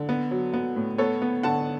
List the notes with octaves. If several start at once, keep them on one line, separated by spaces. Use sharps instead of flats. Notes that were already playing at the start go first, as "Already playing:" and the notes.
Already playing: D3
B3
F#3
B3
A2
B3 A4 C#5
B3
D3 F#5 A5